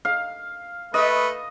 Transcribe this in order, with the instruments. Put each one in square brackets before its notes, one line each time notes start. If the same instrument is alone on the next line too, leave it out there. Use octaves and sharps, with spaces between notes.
[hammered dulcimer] F5
[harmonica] A3 B4 [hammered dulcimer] D#5